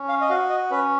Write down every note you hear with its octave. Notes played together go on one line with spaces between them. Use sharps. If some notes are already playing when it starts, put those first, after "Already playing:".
Already playing: C#4
F5
D#5
F#4 F5
D#5
C#4 B4